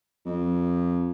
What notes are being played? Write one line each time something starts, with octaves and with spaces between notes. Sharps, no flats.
F2